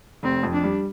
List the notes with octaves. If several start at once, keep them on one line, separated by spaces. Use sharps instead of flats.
F1 C4
F2
D4
G3